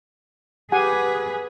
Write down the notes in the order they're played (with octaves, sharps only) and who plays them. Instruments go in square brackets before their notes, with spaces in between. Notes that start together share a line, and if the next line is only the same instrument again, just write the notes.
[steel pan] G4 F#5 G#5 [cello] G#4 B4